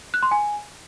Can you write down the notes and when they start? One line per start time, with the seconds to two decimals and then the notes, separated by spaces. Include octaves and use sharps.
0.14 F#6
0.23 C6
0.31 G#5